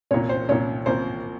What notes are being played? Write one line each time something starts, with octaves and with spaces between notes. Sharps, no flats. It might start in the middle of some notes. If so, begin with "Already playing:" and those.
C2 A#2 C#5
C5
C2 A#2 C#5
C2 A#2 C5